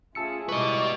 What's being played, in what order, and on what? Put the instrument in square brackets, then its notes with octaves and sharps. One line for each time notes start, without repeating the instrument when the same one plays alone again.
[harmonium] A3 C#4 [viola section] F4 G#4 [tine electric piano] A5 E6 C#7
[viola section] G3 D5 [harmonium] G#3 E4 A#4 [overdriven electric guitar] B4 D#5 [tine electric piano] C#6